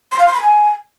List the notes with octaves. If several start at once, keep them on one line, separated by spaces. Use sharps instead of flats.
C6
F5
C6
B5
G#5